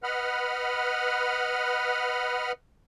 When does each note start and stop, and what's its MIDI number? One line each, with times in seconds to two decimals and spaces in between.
0.03 2.52 71
0.03 2.52 75
0.03 2.52 78
0.03 2.52 83
0.03 2.52 89